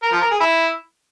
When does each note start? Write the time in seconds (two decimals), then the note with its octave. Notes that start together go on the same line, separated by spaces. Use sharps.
0.03 A#4
0.12 F3
0.22 A#4
0.31 G#4
0.40 E4